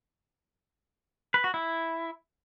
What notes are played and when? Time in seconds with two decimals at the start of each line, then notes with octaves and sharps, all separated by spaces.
1.34 B4
1.44 F#4
1.54 E4